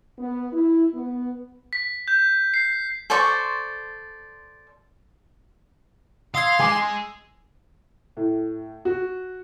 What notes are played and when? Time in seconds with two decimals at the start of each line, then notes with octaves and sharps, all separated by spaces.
0.19 B3
0.52 E4
0.94 B3
1.73 B6
2.08 G6
2.54 C7
3.10 A4 C5 D5 C#6
6.34 F5 C6 D#6 E6 G#6
6.60 G#3 G#5 D6
8.17 A2
8.85 F#4